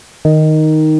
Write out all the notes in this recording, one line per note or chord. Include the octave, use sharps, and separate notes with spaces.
D#3